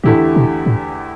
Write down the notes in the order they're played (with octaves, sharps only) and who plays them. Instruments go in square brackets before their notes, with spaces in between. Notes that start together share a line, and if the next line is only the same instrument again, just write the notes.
[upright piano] E2 D3 A3 E4 G4 [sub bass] A2
[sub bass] B2
A2